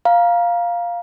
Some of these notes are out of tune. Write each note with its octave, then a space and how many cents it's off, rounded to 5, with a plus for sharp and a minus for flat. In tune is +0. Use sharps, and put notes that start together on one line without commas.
F5 +0 A#5 +20